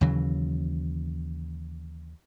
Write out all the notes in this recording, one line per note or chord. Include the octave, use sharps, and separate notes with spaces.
D#2 C#3 E3 F#3